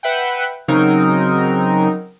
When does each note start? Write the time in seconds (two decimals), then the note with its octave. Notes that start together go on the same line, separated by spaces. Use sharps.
0.03 B4 E5 F#5 G5
0.68 C#3 F#3 C4 D#4 A#4